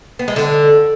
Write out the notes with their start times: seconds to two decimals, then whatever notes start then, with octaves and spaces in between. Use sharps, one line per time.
0.19 B3
0.28 G#3
0.36 D3